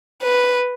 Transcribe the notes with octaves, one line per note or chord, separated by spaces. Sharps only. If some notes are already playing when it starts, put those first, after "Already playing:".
B4